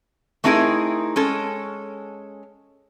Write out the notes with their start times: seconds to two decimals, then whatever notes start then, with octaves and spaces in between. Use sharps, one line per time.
0.44 A3 C4 D#4 E4 G#4 A#4
1.16 G#3 C#4 A4